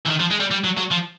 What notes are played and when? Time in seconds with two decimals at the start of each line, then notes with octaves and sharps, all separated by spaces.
0.06 E3
0.10 D#3
0.20 F3
0.31 G#3
0.40 G3
0.51 G3
0.64 F#3
0.78 F#3
0.91 F3